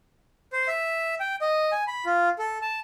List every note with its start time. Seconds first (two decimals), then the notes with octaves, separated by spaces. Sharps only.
0.53 C5
0.68 E5
1.20 G5
1.41 D#5
1.72 G#5
1.87 B5
2.06 F4
2.39 A4
2.62 A5